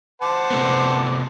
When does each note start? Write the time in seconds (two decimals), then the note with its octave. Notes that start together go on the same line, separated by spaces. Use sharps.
0.22 C5 F#5 A5 D6
0.50 C3 A3 B3